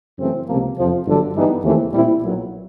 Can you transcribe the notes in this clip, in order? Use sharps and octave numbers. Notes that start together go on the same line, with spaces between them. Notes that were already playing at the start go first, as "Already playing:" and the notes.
F#2 C#3 E3 A3 C4
C#2 C3 F3 A#3
F2 C3 F3
G1 G2 D3 F#3
G2 E3 G3 B3 D#4
D#2 C#3 E3 A3 C4
A#2 G3 C4 E4
B1 A#2 F#3